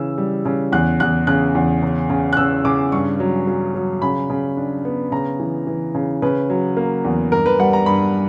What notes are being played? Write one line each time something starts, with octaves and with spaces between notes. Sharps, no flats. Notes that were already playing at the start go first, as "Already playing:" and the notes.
Already playing: C#3 E3 E6
G3
C#3
E2 F#6
E2 F#6
C#3 F#6
E2
C#3
C#3
F#6
C#3 E6
C#3 D6
G2 C#6
F#3
F#3
F#3
C#3 B5
C#3
D4
B3
C#3 A#5
E3
E3
C#3
C#3 B4
F#3
A#3
E2
G2 A#4
B4
G3 F#5
A#5
G2 B5